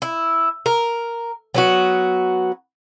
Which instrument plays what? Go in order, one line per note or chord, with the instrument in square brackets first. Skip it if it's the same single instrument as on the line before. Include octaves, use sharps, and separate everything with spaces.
[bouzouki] E4
A#4
F#3 B3 F#4